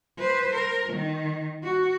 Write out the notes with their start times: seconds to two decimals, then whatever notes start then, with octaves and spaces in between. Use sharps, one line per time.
0.18 B4 C5
0.55 A#4
0.93 D#3
1.64 F#4